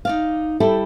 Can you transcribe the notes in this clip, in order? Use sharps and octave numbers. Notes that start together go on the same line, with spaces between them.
D#4 D5 F5
G3 E4 G4 A4